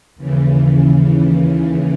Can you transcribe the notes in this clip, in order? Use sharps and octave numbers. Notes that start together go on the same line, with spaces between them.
D#2 C#3 E3